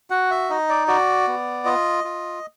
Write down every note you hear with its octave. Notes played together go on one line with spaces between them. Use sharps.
F#4 F#5
E5
D#4 D#5
D5
F#4 D5
B3
F4 D#5
F4